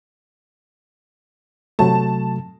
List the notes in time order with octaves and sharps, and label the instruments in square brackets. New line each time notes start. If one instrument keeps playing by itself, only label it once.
[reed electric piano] C3 F#3 A3 [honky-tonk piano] A5